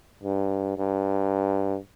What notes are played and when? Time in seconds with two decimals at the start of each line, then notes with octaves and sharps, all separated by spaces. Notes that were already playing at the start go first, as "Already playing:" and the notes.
0.23 G2
0.78 G2